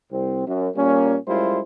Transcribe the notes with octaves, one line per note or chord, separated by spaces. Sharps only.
C2 C4
F#2
A#2 G3 A#3 C#4
F#2 G3 G#3 E4 F4 C5